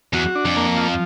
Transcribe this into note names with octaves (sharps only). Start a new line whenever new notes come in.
E2 F#4
D4
F2
A#3
F3